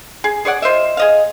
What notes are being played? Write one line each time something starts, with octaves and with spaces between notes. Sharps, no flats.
G#4
G#4 C#5 D5 F#5
F4 C5 D#5 E5
G#4 D#5 F5